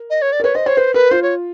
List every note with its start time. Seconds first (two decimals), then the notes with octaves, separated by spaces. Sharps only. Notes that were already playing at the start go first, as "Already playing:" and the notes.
Already playing: A#4
0.10 D#5
0.22 C#5
0.32 D5
0.40 A#4
0.44 B4 C#5
0.55 C5 D#5
0.66 C5 C#5
0.77 B4 C5
0.94 A#4 B4
1.11 F4 C5
1.23 C#5